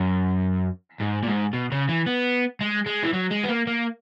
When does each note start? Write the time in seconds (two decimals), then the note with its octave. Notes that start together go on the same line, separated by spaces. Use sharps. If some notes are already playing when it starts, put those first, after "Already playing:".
Already playing: F#2
1.00 G#2
1.23 A#2
1.27 G#2
1.53 B2
1.72 C#3
1.89 E3
2.06 B3
2.61 G#3
2.86 G#3
3.04 E3
3.13 F#3
3.31 G#3
3.44 B3
3.49 A#3
3.67 A#3